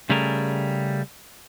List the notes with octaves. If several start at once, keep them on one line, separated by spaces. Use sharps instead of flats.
C#3 G3 A3 G#4 A#4